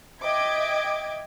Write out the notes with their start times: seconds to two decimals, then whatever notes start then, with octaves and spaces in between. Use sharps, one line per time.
0.23 D#5 E5 G5 D6 G#6